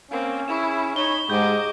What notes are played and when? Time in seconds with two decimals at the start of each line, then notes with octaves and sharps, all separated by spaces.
0.11 A#3 C4 C#4
0.48 E4 G#4 C#6 E7
0.96 D#4 C#5 B5 G7
1.30 G#2 G4 D#5 D6 G6